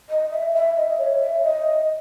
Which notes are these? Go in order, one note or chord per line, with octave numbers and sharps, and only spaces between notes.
D#5
E5
E5
D#5
C#5
E5
D#5